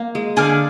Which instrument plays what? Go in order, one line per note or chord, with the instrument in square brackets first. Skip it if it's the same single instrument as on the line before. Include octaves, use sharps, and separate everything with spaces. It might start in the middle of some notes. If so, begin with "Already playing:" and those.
Already playing: [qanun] A#3
G#3
[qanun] D3 D4 [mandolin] G#4 D5 F5